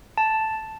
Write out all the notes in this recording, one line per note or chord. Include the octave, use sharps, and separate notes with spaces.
A5